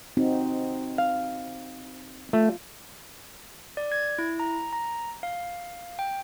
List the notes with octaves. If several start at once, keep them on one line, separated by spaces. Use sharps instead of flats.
C4 D#4 F#4
F5
A3 F4
D5
G#6
E4
A#5
A#5
F5
G5